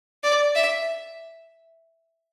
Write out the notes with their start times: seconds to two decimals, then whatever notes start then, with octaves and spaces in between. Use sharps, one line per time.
0.23 D5
0.55 E5